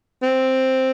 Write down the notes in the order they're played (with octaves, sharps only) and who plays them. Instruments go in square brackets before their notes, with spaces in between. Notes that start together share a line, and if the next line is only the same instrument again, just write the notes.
[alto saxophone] C4